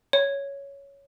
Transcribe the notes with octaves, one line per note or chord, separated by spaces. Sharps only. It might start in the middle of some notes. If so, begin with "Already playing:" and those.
C#5